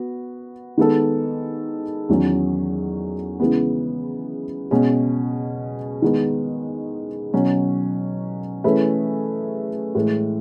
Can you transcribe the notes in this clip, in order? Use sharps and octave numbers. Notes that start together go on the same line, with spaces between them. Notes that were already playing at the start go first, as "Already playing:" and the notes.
Already playing: B3 F#4
D#3 G#3 B3 D#4 A4
E2 D#3 F#3 C#4
C#3 E3 G#3 B3
B2 G#3 C#4
D#3 G#3 B3
B2 F#3 C#4
E3 A3 C#4 G#4 B4
A2 E3 G#3